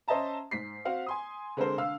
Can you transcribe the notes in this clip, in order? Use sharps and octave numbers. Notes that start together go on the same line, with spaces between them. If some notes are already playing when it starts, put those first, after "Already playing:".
C#4 C5 D#5 E5 A5 A#5
G#2 B6 C7
C4 F#4 F5 F#5
G#5 C6 D#6
D3 G#3 C4 A4 A#4 C5
D3 F5 E6